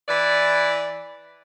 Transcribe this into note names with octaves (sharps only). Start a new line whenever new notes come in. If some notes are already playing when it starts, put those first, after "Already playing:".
E3 D5